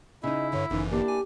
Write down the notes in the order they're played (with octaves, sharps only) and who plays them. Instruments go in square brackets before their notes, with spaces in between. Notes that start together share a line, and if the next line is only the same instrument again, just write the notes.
[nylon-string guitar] C#3 D#4 [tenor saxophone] E4 [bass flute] D#5
[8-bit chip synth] G2 D3 [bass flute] C#5
[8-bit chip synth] G1 F#2 E3 [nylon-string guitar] C#3 [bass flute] D#4
[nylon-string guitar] A#3 E4 [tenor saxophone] D4 [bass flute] G4
[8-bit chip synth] G#5